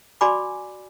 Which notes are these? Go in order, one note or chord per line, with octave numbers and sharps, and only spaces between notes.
F#4 D5 G#5 B5 D6